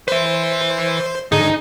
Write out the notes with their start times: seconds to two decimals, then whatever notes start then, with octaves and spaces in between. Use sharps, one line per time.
0.08 B4 C5 E5
1.32 G#2 D3 D#4 G#4